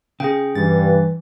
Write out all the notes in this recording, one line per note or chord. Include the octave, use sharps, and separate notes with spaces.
C#3 G#4 G5
G2 E3 A6